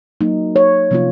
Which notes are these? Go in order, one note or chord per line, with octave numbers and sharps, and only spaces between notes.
F#3 A#3 D#4
C#5
C3 F3 A#3 C#4 F4